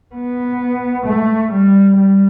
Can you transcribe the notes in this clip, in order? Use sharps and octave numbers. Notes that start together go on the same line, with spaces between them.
B3
A3
G3
G3